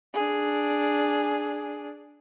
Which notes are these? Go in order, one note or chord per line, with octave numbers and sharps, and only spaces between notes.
D4 G#4